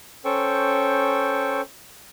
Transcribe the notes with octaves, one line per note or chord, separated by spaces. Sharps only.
C#4 A4 C5 G5 C#6